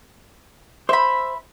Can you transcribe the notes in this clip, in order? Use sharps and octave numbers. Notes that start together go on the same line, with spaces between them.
C5 E5 B5